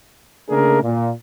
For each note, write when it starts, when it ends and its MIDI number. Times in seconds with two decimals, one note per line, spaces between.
0.50 0.82 49
0.50 0.82 57
0.50 0.82 58
0.50 0.82 62
0.50 0.82 68
0.50 0.82 70
0.83 1.11 46